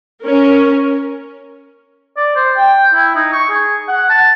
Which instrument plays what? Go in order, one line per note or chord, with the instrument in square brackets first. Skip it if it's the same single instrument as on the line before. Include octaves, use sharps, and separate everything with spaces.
[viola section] C#4 A#4
[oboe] D5
C5
G5
E4
D#4
C#6
G#4
F#5
A5